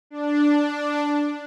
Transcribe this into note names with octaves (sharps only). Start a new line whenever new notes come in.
D4